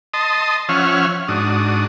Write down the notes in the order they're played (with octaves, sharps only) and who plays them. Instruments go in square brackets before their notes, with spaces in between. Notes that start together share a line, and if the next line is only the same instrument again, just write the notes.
[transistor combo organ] D#5 A5 C6 D#6
F3 C#4 C#5 E5 F#5 F6
G#2 D4 F#4 D#6